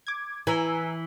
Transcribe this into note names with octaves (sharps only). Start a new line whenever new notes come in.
D6 G#6
E3 G#5 A#5 E6